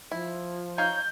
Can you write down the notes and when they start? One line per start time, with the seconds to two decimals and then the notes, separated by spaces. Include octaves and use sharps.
0.11 F3 E4
0.78 D#4 C#5 F5 G6